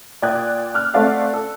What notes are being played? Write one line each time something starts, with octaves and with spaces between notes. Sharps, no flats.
A#2 D5 G5 D#6 F#6 G#6
D6 F6 F#6
A3 C4 A4 D5 F5 F#5
A4